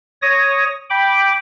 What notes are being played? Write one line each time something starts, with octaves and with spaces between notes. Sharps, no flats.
C#5 D#6 A#6
G5 B5 D6